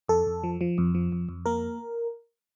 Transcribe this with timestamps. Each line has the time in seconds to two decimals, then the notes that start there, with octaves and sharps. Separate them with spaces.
0.08 F2 A4
0.27 F2
0.43 F3
0.61 F3
0.78 F2
0.94 F3
1.12 F2
1.29 F2
1.46 A#3 A#4